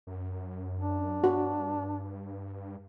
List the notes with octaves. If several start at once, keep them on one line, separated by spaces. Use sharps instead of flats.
F#2
D4
G2 F#4